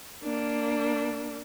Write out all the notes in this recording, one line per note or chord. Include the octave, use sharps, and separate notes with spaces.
A#3 D4